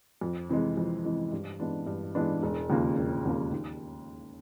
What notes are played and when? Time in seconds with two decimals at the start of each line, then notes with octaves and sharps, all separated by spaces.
0.21 F2
0.49 C3 E3 G#3
0.77 F2
1.05 C3 E3 G#3
1.32 G2
1.60 E3 G#3 B3 D4
1.86 G2
2.15 E3 G#3 B3 D4
2.43 E1
2.70 D#2 C#3 F3 A#3
2.97 E1
3.25 D#2 C#3 F3 A#3
3.53 D#2